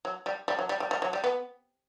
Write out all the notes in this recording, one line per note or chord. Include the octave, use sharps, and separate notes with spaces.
F#3
G3
G3
F#3
G3
G3
G3
F#3
G3
B3